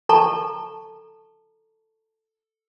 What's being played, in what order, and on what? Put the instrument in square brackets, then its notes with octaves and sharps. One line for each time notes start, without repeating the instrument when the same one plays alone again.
[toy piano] A4 A5 A#5 C#6